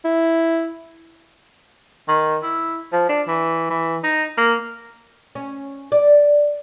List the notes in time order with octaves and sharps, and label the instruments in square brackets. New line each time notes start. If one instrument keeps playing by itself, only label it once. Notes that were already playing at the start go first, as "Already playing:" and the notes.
[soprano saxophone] E4
[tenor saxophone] D#3
E4
F3
D4
E3
E3
D#4
A#3
[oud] C#4
D5